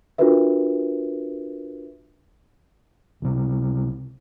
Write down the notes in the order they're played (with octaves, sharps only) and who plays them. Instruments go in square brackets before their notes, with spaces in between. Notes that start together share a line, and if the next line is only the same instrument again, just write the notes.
[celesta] D4 F4 F#4 A#4 B4 E5
[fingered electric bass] C#2 C3